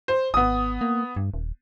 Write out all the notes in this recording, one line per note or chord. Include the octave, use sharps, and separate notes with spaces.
C5
G#1 B3 D#6
A#3
G2
D#1